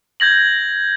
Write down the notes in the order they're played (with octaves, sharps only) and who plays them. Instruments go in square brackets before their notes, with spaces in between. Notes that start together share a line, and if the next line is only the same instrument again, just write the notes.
[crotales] G6 G#6 A#6 F#7